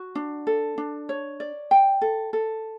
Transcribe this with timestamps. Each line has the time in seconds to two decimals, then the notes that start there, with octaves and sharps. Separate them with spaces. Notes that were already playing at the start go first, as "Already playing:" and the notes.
Already playing: F#4
0.15 D4
0.47 A4
0.78 D4
1.09 C#5
1.40 D5
1.71 G5
2.02 A4
2.33 A4